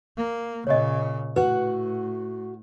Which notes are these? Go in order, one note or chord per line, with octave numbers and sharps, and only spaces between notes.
A#3
A#2 C#3 C#5 D#5
A2 F#4 B4 F#5